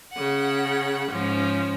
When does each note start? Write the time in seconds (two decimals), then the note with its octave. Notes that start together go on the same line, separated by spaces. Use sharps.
0.13 C#3 F#5
1.09 G#2 F3 C#4